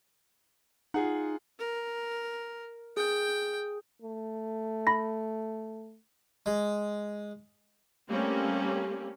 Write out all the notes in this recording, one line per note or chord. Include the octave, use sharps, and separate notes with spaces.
D#4 F4 G#4 F#5
A#4
G#4 G5
A3
B5 A#6
G#3
G3 A3 A#3 C4 C#4 G4